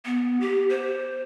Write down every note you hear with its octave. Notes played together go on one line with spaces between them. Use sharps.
B3
G4
C5